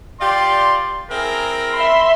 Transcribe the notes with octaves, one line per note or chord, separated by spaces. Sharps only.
F4 G4 D5 C6
C4 E4 G#4 A#4
E5 B5 C6